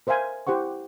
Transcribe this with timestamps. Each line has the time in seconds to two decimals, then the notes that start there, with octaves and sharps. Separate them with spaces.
0.07 A#4 C5 E5 F5 G#5
0.47 E4 G4 C5 F#5 C#6